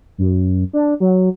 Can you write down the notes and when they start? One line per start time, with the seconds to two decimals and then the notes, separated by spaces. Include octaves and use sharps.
0.18 F#2
0.73 D4
1.00 F#3